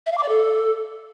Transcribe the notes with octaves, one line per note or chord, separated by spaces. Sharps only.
E5
F5
D6
D5
A4